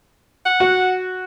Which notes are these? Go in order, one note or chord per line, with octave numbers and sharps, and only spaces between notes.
F#5
F#4